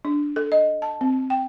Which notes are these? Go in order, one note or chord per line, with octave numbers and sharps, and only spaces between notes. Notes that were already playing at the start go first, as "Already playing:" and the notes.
D4
A4
D#5
A5
C4
G5